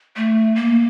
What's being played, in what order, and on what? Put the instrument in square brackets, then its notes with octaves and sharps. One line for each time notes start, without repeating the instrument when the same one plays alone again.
[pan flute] A3
A#3